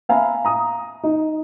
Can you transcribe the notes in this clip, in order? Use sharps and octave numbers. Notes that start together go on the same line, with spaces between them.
E5 F5 G#5 A#5 B5
A#5 D#6
D#4